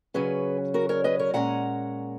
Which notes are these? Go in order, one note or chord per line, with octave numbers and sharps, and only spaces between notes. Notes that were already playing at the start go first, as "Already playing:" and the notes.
C#3 F#3 C#4 G#4 B4
F#4 A#4
A#4 C#5
B4 D#5
A#4 C#5
A#2 G#3 C#4 F#5 A#5